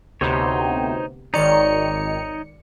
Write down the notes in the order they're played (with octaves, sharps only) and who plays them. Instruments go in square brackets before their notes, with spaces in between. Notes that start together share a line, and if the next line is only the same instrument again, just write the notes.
[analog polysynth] D2 C3 B3 [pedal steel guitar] D#4 C5 C#5
[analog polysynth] G#1 D#3 C#7 [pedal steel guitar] D#4 C#5 [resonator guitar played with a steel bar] D5